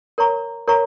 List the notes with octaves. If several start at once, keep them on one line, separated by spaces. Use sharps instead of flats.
A#4 C#5 A#5 C#6
A#4 C#5 A#5 C#6